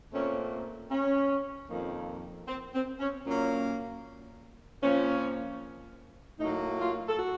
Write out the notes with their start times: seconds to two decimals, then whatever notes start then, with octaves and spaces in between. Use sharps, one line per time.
0.13 A#2 A3 C4 C#4
0.91 C#4
1.69 F2 D#3 A#3
2.48 C4
2.74 C4
3.00 C#4
3.26 A#2 F#3 A#3 C#4
4.83 A#2 F3 C4 C#4
6.40 A2 F#3 A#3 D#4
6.79 F4
7.08 A4
7.18 F#4